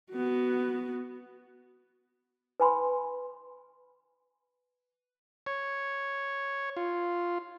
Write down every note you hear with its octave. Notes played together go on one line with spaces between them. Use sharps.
B3 F#4
B4 G#5 B5 C6
C#5
F4